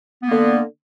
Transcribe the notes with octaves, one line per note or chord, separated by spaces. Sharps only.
D3 A#3 B3